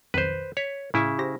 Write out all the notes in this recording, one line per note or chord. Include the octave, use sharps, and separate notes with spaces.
B1 F2 D#3 B4 C5
C#5 B6
A2 C#3 E4 G#5 C#6
G4 C5 A#6